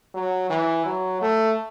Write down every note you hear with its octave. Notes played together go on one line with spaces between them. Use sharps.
F#3
E3
F#3
A3